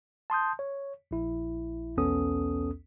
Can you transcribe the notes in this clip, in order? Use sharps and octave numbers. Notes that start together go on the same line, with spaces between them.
A5 C6 D#6 G6
C#5
A#1 E4
B1 E2 B3 C#4 A4 D#6